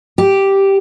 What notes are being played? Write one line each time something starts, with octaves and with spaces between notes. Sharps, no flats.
G4